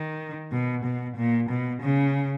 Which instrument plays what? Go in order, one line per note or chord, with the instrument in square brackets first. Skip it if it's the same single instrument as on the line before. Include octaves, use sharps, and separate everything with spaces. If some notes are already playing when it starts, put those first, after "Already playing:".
Already playing: [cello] D#3
B2
B2
A#2
B2
C#3